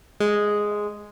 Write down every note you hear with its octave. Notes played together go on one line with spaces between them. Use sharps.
G#3